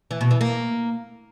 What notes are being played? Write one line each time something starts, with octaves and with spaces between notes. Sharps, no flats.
E3
B2
E3
A#3